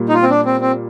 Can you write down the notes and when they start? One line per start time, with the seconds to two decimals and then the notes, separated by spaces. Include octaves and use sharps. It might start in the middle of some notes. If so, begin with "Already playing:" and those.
Already playing: A#2 G3 A#3
0.09 D#4
0.14 F4
0.23 C4
0.30 D4
0.45 C4
0.61 C4